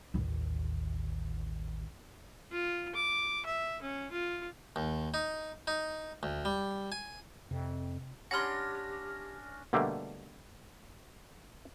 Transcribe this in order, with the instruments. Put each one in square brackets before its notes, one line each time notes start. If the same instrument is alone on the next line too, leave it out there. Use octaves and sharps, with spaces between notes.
[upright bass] A1 D#2
[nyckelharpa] F4
D6
E5
C#4
F4
[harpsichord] D#2
D#4
D#4
D2
G3
G#5
[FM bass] F2 [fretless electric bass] C3
[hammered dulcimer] C#4 D4 [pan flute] G4 [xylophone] F#5 B5 C6 [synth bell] F6 A#6
[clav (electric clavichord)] B2 D3 G3 A3 A#3